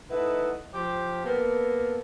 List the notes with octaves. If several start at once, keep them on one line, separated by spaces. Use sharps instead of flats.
A3 D#4 E4 B4 D#5 F#5
F3 G4 C5
A#3 B3 A4